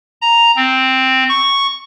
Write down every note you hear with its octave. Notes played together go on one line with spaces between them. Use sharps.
A#5
C4
C#6